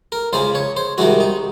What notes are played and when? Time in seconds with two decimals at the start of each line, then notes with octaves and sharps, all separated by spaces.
0.12 A#4
0.33 C#2 C#3 G#3 C5
0.55 C#5
0.77 C5
0.98 C2 C3 D#3 G#3 F#4
1.20 D#4